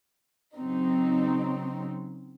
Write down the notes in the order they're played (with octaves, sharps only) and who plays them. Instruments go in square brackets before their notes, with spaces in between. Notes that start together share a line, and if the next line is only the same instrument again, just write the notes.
[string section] C#3 F#3 C4 D#4